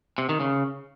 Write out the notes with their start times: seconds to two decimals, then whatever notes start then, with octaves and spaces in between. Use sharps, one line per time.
0.18 C3
0.29 D#3
0.40 C#3